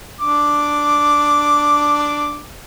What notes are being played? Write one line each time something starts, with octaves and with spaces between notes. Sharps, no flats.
D4 D6